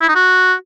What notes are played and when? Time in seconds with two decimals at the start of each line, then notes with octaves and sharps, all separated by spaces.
0.01 E4
0.08 D#4
0.15 F#4